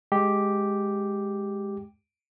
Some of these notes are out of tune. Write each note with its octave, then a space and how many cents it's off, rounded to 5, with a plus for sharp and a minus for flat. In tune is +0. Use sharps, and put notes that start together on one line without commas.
G#3 +0 G4 +0